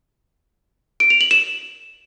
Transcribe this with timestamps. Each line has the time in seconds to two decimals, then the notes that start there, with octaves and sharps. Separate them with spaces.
1.00 D7
1.10 F7
1.21 F#7
1.31 E7